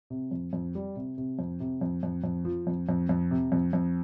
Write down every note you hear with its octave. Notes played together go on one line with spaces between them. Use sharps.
C3
F2
F2
G3
C3
C3
F2
C3
F2
F2
F2
F3
F2
F2
F2
C3
F2
F2